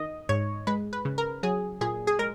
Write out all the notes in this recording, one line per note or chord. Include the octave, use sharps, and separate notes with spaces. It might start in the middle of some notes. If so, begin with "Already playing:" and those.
Already playing: D#3 D#5
G#2 C#5
G#3 B4
B4
C#3
A#4
F#3 G#4
A#2 G#4
G#4
G#3 A#4